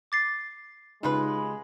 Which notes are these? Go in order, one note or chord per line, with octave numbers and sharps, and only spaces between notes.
D6 A6 C7
C#3 G3 G#3 D#4 F4 B4